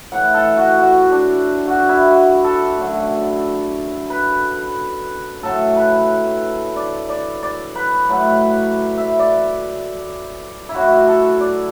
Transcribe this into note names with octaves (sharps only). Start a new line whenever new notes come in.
A2 E3 A3 F#5
A4
F#4
F#4
D4
F#4
E4
F#4
A4
F#2 D3 A3
B4
A2 F#3 A3 A4
B4
D5
D5
D5
B4
A2 F#3 A3
E5
D5
E4
F#2 F#3 A3 F#4
A4
D5